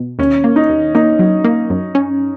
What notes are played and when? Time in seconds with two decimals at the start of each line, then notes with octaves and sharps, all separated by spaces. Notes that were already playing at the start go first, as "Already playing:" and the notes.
Already playing: B2
0.19 D#2 C#4
0.44 A#3
0.56 D#4
0.69 D#2
0.95 A#3 D#4
1.19 F#3
1.44 A#3
1.70 F#2
1.95 C#4